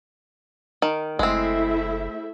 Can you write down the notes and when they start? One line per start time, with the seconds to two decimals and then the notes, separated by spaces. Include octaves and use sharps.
0.82 D#3
1.19 F#1 G#3 A3 C4 E4 E5